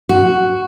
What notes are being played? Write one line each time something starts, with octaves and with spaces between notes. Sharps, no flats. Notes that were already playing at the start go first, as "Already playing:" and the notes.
F#4